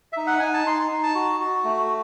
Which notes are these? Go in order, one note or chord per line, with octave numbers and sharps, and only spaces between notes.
D#4 E5
F#5
D#4 G#5
A5
D#4 C6
D#4
A5
F#4
F#4
A3